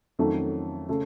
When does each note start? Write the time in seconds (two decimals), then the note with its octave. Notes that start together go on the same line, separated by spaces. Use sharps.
0.19 F2 D#3 F#3 A3 C#4
0.89 C#3 A3